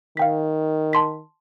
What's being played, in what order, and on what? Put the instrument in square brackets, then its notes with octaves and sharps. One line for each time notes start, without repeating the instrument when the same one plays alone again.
[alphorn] D#3 [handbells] F5 G5 B6
[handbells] A5 C6 B6